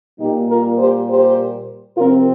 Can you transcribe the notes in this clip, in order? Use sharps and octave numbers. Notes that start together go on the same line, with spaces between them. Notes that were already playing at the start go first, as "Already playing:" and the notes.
A#2 G3 A#3 D#4 G4
F4 A#4
G4 C5
G4 C5
C3 F3 C4 F4 A#4